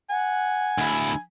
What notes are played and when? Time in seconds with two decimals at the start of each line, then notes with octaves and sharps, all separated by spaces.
0.10 F#5 G#5
0.78 D2 E4